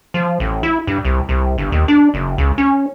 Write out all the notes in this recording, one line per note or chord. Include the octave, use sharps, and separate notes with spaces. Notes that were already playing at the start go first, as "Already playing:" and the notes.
F3
A1
E4
G2
C2
C2
G1
D#2
D4
F#1
C#2
C#4